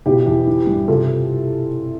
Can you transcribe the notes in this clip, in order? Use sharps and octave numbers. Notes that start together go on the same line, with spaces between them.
B2 E4 G4
E2
E3
G2
C3 F4 A4